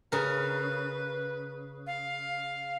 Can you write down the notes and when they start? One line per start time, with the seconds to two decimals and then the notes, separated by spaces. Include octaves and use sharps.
0.12 C#3 A#4 B4
1.87 F5